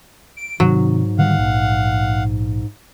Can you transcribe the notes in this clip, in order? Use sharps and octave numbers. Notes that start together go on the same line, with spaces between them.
D7
G#2 C3 D#3 F#3
D3 D#3 G3 F5 F#5
A#1